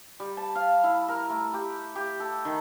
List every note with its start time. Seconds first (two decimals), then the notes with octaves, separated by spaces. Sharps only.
0.20 G3
0.37 A5
0.55 F5
0.84 E4
1.08 A#4
1.30 A3
1.54 G4
1.95 G4
2.20 A4
2.45 D#3